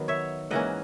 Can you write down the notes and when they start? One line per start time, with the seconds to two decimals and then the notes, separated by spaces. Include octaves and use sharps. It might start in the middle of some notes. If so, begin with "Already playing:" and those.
Already playing: D#3 F#3 B3
0.08 C#5 E5
0.51 G#2 E3 A#3 C#4 D#5 F#5